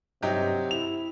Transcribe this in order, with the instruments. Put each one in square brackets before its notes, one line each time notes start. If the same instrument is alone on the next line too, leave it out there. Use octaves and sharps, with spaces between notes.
[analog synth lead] G2 [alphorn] C3 [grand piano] F#3 D#4 G4
[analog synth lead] E4 [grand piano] F7